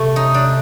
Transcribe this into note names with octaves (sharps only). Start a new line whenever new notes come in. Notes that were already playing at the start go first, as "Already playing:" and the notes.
Already playing: C3 A3
D#4
D4